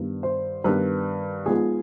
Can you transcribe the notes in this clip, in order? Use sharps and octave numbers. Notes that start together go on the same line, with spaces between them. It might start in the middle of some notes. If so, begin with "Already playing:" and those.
Already playing: G2 D#3 B3
C5
G2 D#3 B3 B4
G#2 F3 B3 G#4